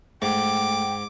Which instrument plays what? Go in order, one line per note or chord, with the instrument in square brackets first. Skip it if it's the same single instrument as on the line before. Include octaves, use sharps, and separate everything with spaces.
[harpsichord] G#2 [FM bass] A3 [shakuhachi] G5 [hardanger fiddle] D6